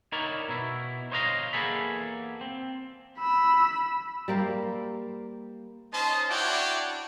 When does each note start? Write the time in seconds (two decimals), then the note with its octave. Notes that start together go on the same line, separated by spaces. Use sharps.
0.12 D#4 E4 A#4 C#5 D5
0.49 B2 E4
1.12 C5 C#5 D#5 F5 A#5 C6
1.53 E2 A#3 G#4 A4 B5
2.41 C4
3.19 B5 E6
4.28 G3 A#3 C5
5.94 C#4 D#4 C5 D#5 A5
6.30 D4 E4 F#4 C#5 D5 G5